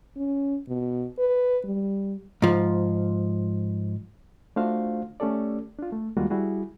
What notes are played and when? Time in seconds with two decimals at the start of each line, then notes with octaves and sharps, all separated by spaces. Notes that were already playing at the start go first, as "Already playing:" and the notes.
0.16 C#4
0.68 B2
1.19 B4
1.64 G3
2.42 G#2 F3
4.56 A3 D4 F4 F#4 C5 F5
5.20 A3 C#4 G4 A4 D5
5.79 D4 F4
5.92 A3
6.17 D#2 G3 G#3 A#3 F4 F#4
6.30 G3 E4 F#4 G#4